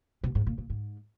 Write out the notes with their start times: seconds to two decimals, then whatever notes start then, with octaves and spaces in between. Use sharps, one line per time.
0.24 B2
0.35 G#2
0.47 A#2
0.58 A#2
0.70 G#2